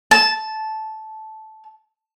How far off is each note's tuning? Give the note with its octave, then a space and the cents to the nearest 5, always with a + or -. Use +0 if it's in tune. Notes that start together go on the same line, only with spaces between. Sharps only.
A5 -10